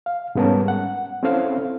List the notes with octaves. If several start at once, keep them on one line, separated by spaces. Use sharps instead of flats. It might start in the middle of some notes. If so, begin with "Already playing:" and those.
F5
G#2 G3 B3 C#4 A#4 A5
F#5
C4 C#4 E4 A4 C5 F5